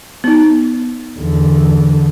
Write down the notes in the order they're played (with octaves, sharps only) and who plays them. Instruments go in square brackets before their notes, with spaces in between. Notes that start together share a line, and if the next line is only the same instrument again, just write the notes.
[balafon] B3 D#4
[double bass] E2 D3